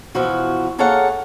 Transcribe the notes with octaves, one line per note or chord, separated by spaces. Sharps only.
B2 E3 F3 F#4
A#3 G#4 A4 C#5 F5 F#5